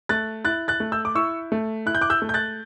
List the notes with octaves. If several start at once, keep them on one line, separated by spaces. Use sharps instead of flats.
A3 F#6 A6
E4 F#6 A6
F#6 A6
A3
E6 G6
D6
E4 C#6 E6
A3
E4 F#6
G6
D6 F#6
E6 G6
A3
G6
F#6 A6